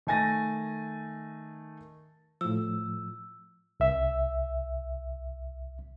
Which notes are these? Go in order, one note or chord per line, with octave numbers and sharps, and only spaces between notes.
D#3 A3 G#5 A6 A#6 D#7
A2 F3 E6
C2 E5